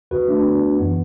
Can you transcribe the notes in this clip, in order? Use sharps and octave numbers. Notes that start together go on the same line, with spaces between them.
D2 D3 F#4 B4
A3 D4
D4
B3
F#2 E3 B3 E4